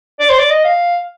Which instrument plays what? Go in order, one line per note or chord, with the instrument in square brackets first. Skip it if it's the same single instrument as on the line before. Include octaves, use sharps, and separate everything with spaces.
[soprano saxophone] D5
C5
D5
D#5
F5